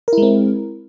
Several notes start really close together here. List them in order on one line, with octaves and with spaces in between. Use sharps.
A#4 E4 G#3 C4